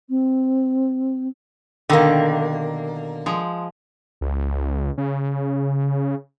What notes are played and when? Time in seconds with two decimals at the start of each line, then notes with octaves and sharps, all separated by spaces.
0.09 C4
1.89 B2 D3 D#3 A#3 G4
3.26 F3 G#3
4.21 C#2
4.98 C#3